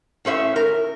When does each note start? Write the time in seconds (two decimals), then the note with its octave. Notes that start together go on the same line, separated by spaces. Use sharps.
0.25 A2 C#4 B4 E5
0.56 A#4